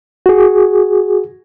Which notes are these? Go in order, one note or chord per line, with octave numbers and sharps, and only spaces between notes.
F#4 G#4